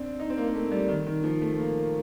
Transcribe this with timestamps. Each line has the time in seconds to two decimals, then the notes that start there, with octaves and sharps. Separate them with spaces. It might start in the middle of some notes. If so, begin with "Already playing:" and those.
Already playing: C4 D4
0.20 D#4
0.30 C4
0.37 A#3
0.48 A#3
0.55 A3
0.72 G3
0.89 D#3
1.07 D#3
1.24 F3
1.41 A3
1.59 A#3